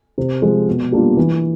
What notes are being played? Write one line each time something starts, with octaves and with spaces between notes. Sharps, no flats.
C3
F3 G#3
B2
G3 A#3 D4 F4
E3